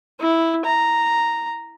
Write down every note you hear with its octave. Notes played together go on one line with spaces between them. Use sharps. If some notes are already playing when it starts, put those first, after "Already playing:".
E4
A#5